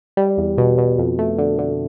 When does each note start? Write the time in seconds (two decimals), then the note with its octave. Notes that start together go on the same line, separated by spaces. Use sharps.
0.17 G3
0.38 E2
0.58 B2
0.78 B2
0.98 F2
1.19 A3
1.38 D3
1.59 D3